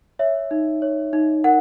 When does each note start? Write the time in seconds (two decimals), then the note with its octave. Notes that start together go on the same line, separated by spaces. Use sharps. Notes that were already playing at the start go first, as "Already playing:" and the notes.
0.19 C#5 E5
0.51 D#4
0.82 C#5
1.13 D#4
1.44 A#4 F#5